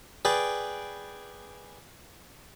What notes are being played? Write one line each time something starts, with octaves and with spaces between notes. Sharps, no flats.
G#4 B4 D5 G5